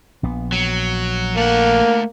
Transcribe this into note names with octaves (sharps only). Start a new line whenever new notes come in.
A#1 B3
F#3
A3 A#3 F#5